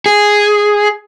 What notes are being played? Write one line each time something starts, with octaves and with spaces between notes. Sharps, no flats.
G#4